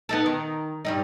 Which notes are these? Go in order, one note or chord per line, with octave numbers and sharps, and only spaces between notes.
B3 D#4 A4
D#3
G2 G3 D#4